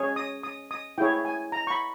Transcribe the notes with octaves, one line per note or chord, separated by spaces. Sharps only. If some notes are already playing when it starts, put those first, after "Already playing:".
Already playing: C#4 G#4 C#5
D#6
D#6
D#6
E4 G#4 C#5 G5
G#5
A#5
C#6
B5